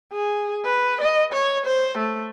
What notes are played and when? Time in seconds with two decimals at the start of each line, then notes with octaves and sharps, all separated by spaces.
0.13 G#4
0.65 B4
1.01 D#5
1.33 C#5
1.66 C5
1.98 A3